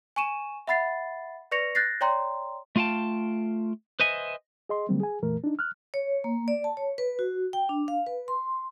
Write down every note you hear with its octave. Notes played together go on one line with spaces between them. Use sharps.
G#5 C#6 D#7 E7
E5 F#5 B5 A6 C7
B4 D5 C#6 A#6 C#7 F7
F#6 G6 A6 A#6 C7
C#5 D5 G5 A#5 C6
A3 F4 F5 G5 A5
B4 C5 D#5 E5 G#5
G#4 D#5 C6
D3 F#3 G3 A3 A#3 C4
G#4 G#5
F2 A#2 E3 A3 A#4
D4 D#4
F6 F#6
C#5
A#3
D5
A5
C#5
B4
F#4
G5
D4
F5
B4
C6